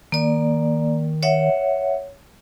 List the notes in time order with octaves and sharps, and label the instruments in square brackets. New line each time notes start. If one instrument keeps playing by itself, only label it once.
[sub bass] D#3 [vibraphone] A#3 D5
[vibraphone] C#5 E5 F#5